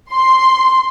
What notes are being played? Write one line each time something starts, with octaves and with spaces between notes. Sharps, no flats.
C6